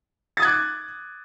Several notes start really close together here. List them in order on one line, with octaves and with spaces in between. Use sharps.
A6 D#6 G#6 F#6 D6